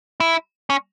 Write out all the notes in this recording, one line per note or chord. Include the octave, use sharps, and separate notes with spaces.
E4
C#4